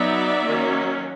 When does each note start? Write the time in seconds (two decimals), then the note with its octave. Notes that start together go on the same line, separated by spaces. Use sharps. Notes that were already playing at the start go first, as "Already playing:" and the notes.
Already playing: F#3 B3 D#4 D5 E5
0.46 D#3 F#3 A#3 C#4